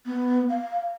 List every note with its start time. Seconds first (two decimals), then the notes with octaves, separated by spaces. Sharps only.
0.06 B3
0.49 F5